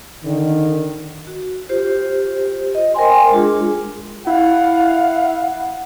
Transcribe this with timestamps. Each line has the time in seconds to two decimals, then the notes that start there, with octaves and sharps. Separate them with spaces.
0.24 D3 D#3
1.27 F#4
1.69 F4 G4 C5
2.75 D#5
2.94 A#4 C5 G5 G#5 C6
3.31 G#3 D4 F4 G#4
4.27 E4 F5 F#5